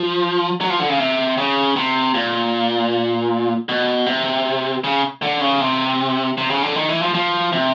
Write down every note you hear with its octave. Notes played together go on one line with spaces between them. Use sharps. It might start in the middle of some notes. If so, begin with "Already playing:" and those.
Already playing: F3
F#3
F3
D3
C#3
C3
C#3
C3
A#2
B2
C3
C#3
D3
C#3
C3
C3
C#3
D3
D#3
E3
F3
F3
C3